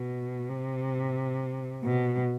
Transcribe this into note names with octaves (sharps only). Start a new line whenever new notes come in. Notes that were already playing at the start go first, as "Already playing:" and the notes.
Already playing: B2
C3
B2